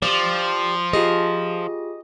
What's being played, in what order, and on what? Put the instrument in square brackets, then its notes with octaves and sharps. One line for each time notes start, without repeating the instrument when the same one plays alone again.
[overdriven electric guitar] F3 [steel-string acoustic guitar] G4 D5
[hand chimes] F4 G4 G#4 [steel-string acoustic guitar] D#5